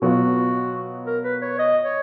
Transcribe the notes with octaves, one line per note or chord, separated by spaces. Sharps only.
B2 F#3 B3 F4 F#4
A#4
B4
C#5
D#5
C#5